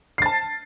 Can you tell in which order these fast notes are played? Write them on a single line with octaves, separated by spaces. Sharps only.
C7 A6 A5